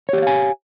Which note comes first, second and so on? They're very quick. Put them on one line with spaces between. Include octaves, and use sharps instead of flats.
C#5 G4 D5 F5 G#5